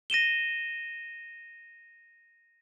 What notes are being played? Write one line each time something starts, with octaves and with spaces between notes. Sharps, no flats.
A#6 D#7 E7 G7